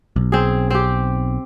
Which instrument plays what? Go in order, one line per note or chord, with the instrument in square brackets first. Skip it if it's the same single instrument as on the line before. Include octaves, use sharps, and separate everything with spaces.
[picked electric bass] B1
[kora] C4 G#4
C4 G4